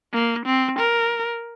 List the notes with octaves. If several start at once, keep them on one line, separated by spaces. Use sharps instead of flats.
A#3
C4
A#4